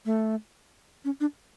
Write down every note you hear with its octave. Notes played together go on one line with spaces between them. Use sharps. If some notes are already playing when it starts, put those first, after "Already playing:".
A3
C#4
D4